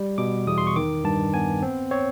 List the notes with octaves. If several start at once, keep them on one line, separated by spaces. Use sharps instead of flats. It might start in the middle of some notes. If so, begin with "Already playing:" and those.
Already playing: G3
B2 D6
E2 D#6
C6
C#6
D#3 D6
G2 A5
B3 G#5
C4
C4 C#5